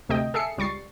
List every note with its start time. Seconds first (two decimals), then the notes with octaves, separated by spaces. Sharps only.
0.09 D2 C3 A3 D#5 G5
0.34 G#4 A4 E5 C7 C#7
0.58 C#2 G3 C#6 A6 C7